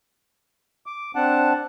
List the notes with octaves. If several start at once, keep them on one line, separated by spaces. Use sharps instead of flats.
D6
C4 D4 F#5 A5